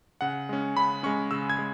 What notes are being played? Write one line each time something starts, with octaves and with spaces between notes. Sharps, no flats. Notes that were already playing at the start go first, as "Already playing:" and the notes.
C#3 F#5
G#3 C#4
C#3 B5
G#3 C#4 C#6
C#3 E6
G#6
G#3